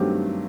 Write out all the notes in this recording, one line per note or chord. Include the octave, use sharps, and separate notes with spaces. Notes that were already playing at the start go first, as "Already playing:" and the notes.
Already playing: G2 D#3 F#3 A3 C4 G4